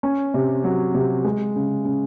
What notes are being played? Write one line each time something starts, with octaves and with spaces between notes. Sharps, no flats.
C#4
C3
F#3
C3
G#3
C#3
C#3